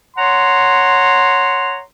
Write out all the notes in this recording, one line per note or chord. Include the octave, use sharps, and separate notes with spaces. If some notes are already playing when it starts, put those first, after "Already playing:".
C#5 F#5 A#5 C6